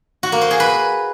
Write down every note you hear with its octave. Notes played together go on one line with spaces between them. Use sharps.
F#4
A#3
C5
G#4
B4